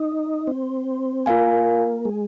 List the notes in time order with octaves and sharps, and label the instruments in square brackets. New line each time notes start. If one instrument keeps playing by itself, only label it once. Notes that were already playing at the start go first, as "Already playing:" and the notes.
Already playing: [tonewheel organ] D#4
C4
[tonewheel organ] A#3 [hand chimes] F4 A#4 F5 G#5
[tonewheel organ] G#3